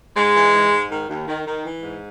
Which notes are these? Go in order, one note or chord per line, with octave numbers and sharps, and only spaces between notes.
G#2 G#3
E3
G#2
G#2
D#3
D#2
D#3
D#3
E3
G#2